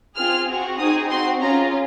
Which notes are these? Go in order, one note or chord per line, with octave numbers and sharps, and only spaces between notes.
C4 F4 G#4 F6
C4 F#4
C4 D#4 G#4 D#6
C4 F#4 C6
C#4 F4 G#4 A#5